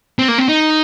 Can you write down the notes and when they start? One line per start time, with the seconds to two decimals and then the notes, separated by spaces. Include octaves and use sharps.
0.19 C4
0.28 A#3
0.38 C4
0.49 D#4